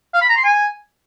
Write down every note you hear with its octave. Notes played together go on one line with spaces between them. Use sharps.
F5
B5
A#5
C6
G#5